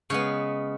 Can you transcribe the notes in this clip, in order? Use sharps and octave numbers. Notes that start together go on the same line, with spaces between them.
C#3 G#3 B3 C#5